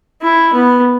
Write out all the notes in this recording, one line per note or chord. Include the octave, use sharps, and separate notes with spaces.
E4
B3